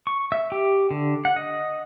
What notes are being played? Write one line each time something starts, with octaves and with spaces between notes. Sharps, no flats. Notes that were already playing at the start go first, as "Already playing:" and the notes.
C#6
E5
G4
D3
F#5
D#5